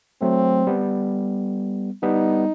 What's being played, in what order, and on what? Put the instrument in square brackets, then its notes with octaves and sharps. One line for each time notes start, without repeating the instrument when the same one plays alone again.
[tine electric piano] F#3 A3 [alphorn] C4
[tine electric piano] G3 B3
[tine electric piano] G3 B3 [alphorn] D#4